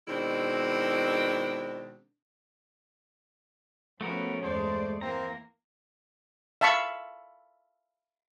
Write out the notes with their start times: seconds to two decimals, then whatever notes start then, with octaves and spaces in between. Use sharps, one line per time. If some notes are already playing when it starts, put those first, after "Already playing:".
0.08 B2 D#3 G#3 C4 D4 E4
4.01 F3 A3 B3 C#4 F#4 A#4
4.43 E2 G2 G#3 A3 C5 D5
5.01 E3 A#3 C4 A#4 A#5
6.61 E5 F5 A5 B5 C#6